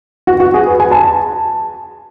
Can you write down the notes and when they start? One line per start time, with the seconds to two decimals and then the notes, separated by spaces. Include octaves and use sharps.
0.27 F#4
0.40 F#4
0.54 G#4
0.67 B4
0.80 G#5
0.91 A5